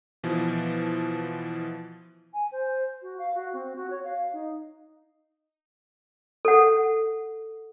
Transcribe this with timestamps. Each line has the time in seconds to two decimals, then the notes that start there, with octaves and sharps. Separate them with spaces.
0.24 B2 E3 F3
2.34 G#5
2.52 C5
3.02 F#4
3.18 F5
3.35 F#4
3.53 C4
3.76 F#4
3.90 C#5
4.04 F5
4.33 D#4
6.45 A4 F#5